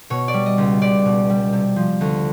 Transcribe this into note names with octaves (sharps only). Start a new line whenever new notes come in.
B2 C#5
D5
G3
D#5
C#2
C#2 D5
B2
G3
C3
F3
D2